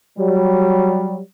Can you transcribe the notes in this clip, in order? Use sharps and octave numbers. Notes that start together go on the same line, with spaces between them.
F#3 G3